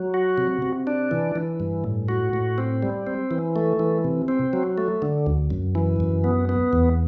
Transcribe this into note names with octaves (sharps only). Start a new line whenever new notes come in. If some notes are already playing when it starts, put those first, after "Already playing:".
Already playing: F#3
F#4
C3
C3
D4
E3
E3
G2
A2
F#4
A2
C4
G3
C4
E3
A3
E3
C3
C4
F#3
A3
D3
D2
F#2
E3
F#2
B3
B3
E2